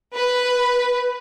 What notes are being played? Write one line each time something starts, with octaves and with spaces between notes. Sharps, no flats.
B4